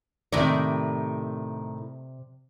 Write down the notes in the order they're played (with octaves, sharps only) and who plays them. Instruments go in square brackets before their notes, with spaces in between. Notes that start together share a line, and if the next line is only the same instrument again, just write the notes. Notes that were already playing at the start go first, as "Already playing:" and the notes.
[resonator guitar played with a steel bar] A2 D#3 [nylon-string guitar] C3 G4 D5